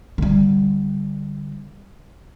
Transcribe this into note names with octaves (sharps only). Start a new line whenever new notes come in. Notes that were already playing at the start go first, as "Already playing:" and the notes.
D3 G3